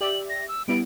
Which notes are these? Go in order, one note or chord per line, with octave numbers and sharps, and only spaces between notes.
G4 D5 E5 F#7
A#6
E6
G3 B3 E4 D7